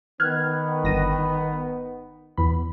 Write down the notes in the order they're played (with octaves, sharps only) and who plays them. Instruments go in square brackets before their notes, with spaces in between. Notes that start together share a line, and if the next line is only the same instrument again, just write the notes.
[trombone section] D#3 B3 [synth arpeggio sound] F6 F#6 G#6
[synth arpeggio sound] G1 A#6 D#7
E2 B5